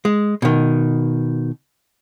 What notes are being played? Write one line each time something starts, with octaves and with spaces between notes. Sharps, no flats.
G#3
B2 D#3